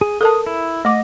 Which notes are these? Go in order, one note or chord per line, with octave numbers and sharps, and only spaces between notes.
G#4
A4 A#4 A5 D#6
E4
A3 D#5 D6